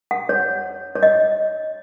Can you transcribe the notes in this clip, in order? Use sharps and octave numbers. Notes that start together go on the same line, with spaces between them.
F#5
C#5
C#5
D#5